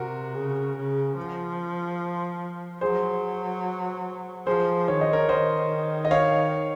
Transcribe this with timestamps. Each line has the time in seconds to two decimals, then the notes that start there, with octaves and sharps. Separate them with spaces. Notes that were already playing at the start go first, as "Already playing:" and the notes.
Already playing: C3 F#4 A#4
0.34 C#3
0.76 C#3
1.17 F3
2.81 F#3 G#4 C5
4.47 F3 G#4 C5
4.88 D#3 C#5
5.01 D#5
5.13 A#4 C#5
5.29 D#3 C5 D#5
6.05 D#5
6.11 C#5 F5